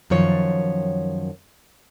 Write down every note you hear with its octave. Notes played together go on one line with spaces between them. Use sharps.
F#2 D#3 F3 C#5